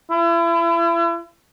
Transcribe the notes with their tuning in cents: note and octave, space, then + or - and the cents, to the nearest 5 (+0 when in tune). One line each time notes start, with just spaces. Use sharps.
E4 +35